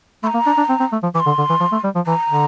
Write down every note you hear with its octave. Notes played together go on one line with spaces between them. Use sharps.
A3 C6
A#5
A#3
D4
D4
C4
C4
A3
F3
E3 D6
C6
D3
D3
E3
F3
A3
G3
F3
E3 A#5
D3